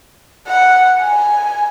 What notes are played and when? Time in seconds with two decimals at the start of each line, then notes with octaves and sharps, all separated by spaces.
0.48 F#5
1.01 G#5